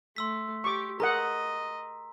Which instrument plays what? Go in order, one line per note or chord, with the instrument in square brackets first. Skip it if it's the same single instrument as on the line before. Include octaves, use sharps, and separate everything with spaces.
[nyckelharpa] A3 [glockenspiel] C6 E6 B6
[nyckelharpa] G4 [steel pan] C#6 D6
[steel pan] G#4 A#4 F#5 [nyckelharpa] D#5 [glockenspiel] A#5